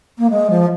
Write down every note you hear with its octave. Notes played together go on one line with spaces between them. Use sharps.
A#3
G#3
F3